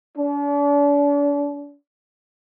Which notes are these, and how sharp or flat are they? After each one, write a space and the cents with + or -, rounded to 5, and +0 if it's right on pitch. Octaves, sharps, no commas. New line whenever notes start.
D4 -40